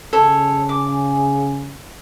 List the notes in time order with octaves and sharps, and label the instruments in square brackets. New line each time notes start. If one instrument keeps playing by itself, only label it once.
[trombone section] C#3 G#4 [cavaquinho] A4 C#5
[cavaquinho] D6